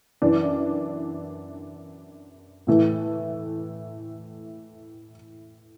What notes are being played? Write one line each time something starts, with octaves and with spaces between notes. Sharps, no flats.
F#2 E3 D4
A2 E3 A3